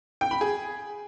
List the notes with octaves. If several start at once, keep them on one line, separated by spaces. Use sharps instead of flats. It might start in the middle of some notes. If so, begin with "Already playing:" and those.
G5
B5
G#4